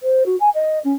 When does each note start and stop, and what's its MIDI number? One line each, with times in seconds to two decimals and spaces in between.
0.02 0.23 72
0.26 0.35 66
0.40 0.49 80
0.54 0.79 75
0.84 0.93 61